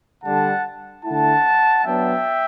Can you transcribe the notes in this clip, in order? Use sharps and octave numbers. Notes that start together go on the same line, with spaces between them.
D3 G3 D4 F#5 A5
D3 A3 E4 F#5 A5
F#3 B3 D4 E5 G5